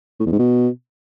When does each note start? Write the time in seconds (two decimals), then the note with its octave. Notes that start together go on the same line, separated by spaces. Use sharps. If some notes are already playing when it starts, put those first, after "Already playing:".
0.20 A2
0.26 E2
0.32 G#2
0.39 B2